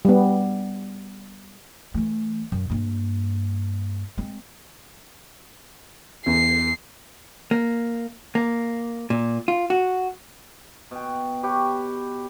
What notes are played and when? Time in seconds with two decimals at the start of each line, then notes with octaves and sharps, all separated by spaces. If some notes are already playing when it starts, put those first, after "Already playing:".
0.05 G3 B3
1.94 E3 A3
2.52 F#2
2.70 G2 A#3
4.17 G#3 C4
6.26 E2 C7
7.51 A#3
8.35 A#3
9.10 A#2
9.48 F4
9.70 F#4
10.91 B2 G5
11.43 G4 B4 C#5 G5